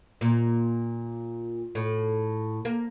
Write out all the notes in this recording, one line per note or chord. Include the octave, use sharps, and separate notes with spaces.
A#2
A2
A#3